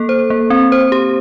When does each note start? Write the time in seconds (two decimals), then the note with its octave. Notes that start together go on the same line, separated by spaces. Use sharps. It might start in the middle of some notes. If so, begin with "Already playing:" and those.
Already playing: A#3 A4
0.09 C5
0.30 A#3
0.50 C4
0.72 C5
0.92 G4